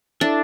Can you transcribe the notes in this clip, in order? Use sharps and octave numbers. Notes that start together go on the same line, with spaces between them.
D4 E4 A4 E5